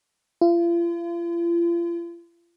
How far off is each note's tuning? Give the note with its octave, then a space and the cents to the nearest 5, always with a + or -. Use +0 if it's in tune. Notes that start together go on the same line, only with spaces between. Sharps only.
F4 -40